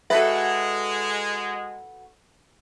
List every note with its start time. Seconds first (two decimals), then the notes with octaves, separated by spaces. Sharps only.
0.10 G#3 F#4 A4 B4 E5